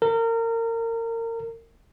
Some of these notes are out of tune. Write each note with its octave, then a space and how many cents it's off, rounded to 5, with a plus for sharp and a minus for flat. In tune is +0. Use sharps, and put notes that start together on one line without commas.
A#4 -30